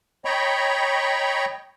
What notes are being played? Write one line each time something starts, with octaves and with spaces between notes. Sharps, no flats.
C#5 D#5 G5 A#5 B5 C#6